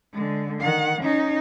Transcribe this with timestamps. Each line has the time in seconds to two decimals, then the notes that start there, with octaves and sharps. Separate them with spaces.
0.13 D3 G#3
0.61 D#3 F#5
1.01 C#4 D#4